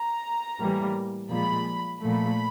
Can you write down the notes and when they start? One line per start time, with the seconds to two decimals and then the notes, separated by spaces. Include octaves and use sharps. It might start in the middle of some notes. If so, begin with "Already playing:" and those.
Already playing: A#5
0.59 A2 E3 G3 A#3
1.30 A#2 F3 G#3 B5
2.01 A#2 F3 A3 B5